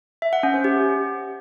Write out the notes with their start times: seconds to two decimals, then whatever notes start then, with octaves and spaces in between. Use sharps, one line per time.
0.22 E5
0.33 F#5
0.43 C#4
0.54 C5
0.64 G4